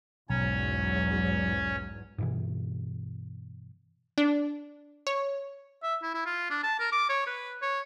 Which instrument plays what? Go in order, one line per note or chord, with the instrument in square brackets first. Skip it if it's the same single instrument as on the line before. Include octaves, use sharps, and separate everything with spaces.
[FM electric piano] B1 [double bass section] E2 G#2 F#3 [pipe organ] C#4 C#5
[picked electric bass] G2 B2 E3
[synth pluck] D4
C#5
[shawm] E5
E4
E4
F4
D4
A5
A#4
D6
C#5
B4
C#5